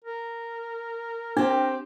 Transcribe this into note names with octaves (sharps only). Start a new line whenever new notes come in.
A#4
C4 D4 G4